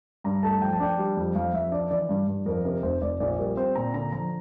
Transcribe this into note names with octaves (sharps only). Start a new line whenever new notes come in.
G2 A#5
A3 A5
F3 G5
A5
D4 G5
G3
F2
F2 F5
F2 E5
D4 D5
E3 D5
G2
G2
F2 A#4
C3 A#4
F1 C5
F1 D5
A#1 D5
G3 A#4
C4 C5
A#2 A#5
D3 A#5
F3 A#5